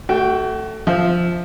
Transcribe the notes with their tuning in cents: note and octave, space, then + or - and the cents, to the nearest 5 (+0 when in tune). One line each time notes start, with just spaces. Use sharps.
A3 +0 F#4 +35 G5 +0
F3 +0 E5 -15